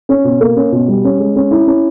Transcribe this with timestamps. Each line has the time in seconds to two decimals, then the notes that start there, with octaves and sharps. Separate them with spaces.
0.09 C#4
0.24 B2
0.41 A#3
0.56 C#4
0.72 B2
0.88 G3
1.04 C#4
1.19 G#3
1.36 C#4
1.51 E4
1.67 C#4